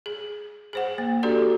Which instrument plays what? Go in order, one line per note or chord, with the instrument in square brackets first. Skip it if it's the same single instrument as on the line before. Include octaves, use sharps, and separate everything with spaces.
[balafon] G#4
G#4 C5 F#5
A#3
D4 F#4 G4 A4 D5 A#5